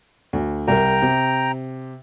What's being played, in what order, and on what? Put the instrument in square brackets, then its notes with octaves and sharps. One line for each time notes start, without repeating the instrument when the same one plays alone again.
[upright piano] D2
[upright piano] C2 A#4 [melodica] G5 A#5
[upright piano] C3